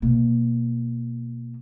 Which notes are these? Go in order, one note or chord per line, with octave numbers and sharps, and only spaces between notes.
B2 A#3